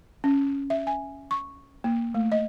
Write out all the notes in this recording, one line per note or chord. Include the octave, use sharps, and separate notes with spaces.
C#4
E5
G#5
C#6
A#3
A3
D#5